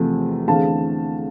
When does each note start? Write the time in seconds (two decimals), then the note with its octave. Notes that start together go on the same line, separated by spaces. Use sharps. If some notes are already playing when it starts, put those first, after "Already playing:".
Already playing: E2 C3 F3 A3 C4
0.48 E2 D3 A3 C4 F5 A5